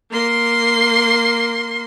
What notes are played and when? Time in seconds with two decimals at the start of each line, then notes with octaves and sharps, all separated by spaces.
0.11 A#3 C6